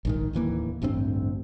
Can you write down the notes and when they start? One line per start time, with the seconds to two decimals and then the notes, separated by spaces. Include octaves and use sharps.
0.05 A#1 G#2 D#3
0.33 D1 D#2 E3 A#3
0.82 A1 D2 G2 C4